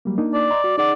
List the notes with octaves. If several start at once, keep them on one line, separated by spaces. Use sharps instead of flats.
F#3 G3 A#3
A#3 D4 D#4
D5
D#5 A#5 C6
F#4
D#4 G#4 D5 F#5